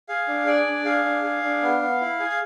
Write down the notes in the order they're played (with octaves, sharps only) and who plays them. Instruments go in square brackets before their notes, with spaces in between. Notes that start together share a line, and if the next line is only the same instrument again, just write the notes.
[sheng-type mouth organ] G#4 F5
D4
G#4 D5
D4
G#4 F5
D4
G#4
D4
B3
B3
E4
G#4
F5